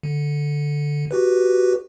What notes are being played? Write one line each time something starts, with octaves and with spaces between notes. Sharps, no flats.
D3
F#4 G4 B4